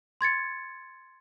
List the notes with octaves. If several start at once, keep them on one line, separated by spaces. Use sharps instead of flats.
C6 G#6 A6 C#7